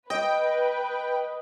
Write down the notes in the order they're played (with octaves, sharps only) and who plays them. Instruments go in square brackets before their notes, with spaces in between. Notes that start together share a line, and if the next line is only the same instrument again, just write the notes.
[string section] B4 [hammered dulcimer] D#5 [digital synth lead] G5